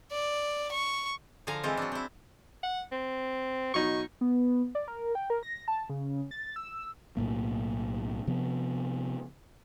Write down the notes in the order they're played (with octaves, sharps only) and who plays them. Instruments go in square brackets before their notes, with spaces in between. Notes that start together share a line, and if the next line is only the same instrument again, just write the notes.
[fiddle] D5
C#6
[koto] D3 F3 F5 G#5 A#5
E3 G#3 C4 E4 F4
F#3 D4
C4 E4
[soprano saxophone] F#5
C4
[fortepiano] B2 F#3 D#4 [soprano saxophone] C#6
[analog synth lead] B3
D5
A#4
G5
A#4
A#6
A5
C#3
A6
E6
[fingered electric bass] B1 A2 A#3
C3 F3 B3